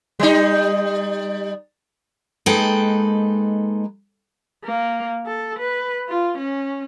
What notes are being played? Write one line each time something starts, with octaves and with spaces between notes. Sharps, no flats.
G3 D#4
G#3 A#3 D#4 A4 B4 G5
A#3
A4
B4
F4
C#4